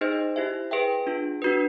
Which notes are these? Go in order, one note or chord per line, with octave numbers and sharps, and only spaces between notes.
D#4 G#4 C5 D#5
E4 G4 C5 E5
G#4 B4 E5 G5
D4 F4 G#4
D4 F#4 B4